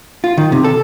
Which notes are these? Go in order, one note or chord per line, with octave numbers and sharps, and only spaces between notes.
F4
D#3
C3
A4